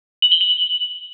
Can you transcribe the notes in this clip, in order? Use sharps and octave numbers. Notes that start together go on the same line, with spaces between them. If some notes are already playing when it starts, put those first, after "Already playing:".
F#7
G7
F#7